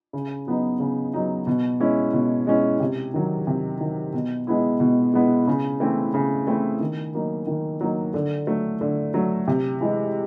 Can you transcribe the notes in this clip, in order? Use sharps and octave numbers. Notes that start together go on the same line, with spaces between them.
C#3
F#3 B3 D#4
C#3
F#3 B3 D#4
B2
G#3 C#4 E4
B2
G#3 C#4 E4
C3
D#3 F#3
C3
D#3 F#3
B2
G#3 B3 E4
B2
G#3 B3 E4
C#3
E3 A3 C4 E4
C#3
E3 A3 C4 E4
D#3
F#3 A#3 D#4
D#3
F#3 A#3 D#4
D3
F#3 A3
D3
F#3 A3
C3
E3 G#3